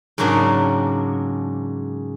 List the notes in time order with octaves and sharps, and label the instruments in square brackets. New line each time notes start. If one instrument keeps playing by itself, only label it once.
[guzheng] G#2 C#3 F#3 A#3 D4